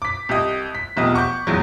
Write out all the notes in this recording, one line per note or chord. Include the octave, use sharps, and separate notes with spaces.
D6 B6
C2 G4 D#5
B6
E1 B1 C3 F3 D#5
F#5 C#6 D6 G6
A#1 E2 F#3